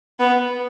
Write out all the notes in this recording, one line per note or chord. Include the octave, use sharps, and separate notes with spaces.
B3